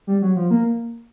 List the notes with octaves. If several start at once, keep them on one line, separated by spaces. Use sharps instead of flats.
G3
F#3
F3
A#3